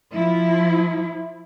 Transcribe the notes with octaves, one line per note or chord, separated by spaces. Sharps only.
F3 E4